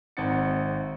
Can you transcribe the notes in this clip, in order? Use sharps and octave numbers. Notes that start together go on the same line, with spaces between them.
G#1 C4 D#4 F#5 A6 C#7